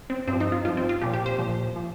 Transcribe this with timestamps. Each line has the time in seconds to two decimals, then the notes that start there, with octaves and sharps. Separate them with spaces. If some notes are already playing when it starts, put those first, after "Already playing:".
0.10 C4
0.27 G2 F3 C4
0.40 D#4
0.52 F4
0.65 G2 F4
0.68 F3
0.77 C4
0.89 F4
1.01 A#2 F3 G4
1.14 G4
1.26 C5
1.38 A#2 F3
1.76 F3